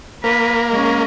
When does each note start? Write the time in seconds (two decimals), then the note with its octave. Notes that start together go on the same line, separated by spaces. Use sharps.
0.24 A#3 B4
0.69 G#3 C#4